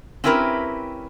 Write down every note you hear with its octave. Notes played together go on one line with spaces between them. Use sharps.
C4 C#4 E4 G4 A#4 B4